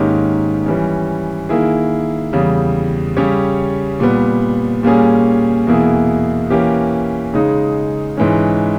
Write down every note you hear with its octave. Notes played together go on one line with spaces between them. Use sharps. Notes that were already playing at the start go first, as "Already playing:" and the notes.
Already playing: G#2 D#3 A#3 C#4 G4
E3 G3 C#4
D#3 A#3 E4 G#4
E2 C#3 G3
C#3 G3 C#4 G4 C#5
A#2 G3 B3
A#2 G3 A#3 C#4 G#4
E2 B2 A#3 E4 G#4
E3 A#3 C#4 G4
C#3 G#3 D#4
G#2 E3 G#3 C#4